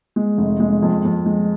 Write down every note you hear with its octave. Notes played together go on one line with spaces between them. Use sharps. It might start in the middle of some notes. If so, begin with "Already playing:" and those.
G#3
F1
G#3
F2
F2
G#3